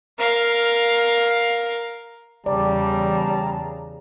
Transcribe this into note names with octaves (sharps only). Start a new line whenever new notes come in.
A#4 F5
E2 C#3 G3 D5 A5 A#5